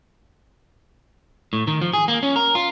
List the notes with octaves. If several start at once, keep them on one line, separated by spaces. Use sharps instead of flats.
A2
D#3
F3
G#4
A#3
C#4
A#4
F4